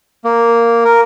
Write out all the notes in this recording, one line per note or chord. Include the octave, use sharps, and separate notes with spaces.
A#3
A#4